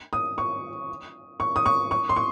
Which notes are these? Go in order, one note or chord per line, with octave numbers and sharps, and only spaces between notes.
D#6
C#6
C#6
D#6
C#6
C#6
C6
C#6